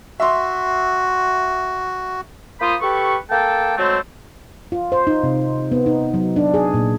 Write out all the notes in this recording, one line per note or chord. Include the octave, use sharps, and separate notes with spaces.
F#4 E5 C6
A#3 F4 C5 B5 D#6
G4 A4 B4 C#6
A#3 A4 G5 A5
F#3 G#3 A3 C4
F4
C5
D#4
C3
B3
D#4
F#3
D4
G#4
A#2